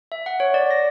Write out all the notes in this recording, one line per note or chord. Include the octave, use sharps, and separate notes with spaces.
E5
F#5
C#5
D5
A#6